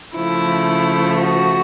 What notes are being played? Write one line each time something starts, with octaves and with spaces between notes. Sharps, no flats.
C#3 F3 A3 E4
F#4